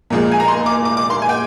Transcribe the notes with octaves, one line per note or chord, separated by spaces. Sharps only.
A#2 F3 G#3
G#5
A#5
C6
D6
D6
D6
C6
G#5
G5